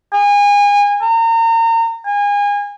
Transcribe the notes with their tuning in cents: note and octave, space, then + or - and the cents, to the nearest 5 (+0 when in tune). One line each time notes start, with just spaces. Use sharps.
G#5 -30
A#5 -35
G#5 -30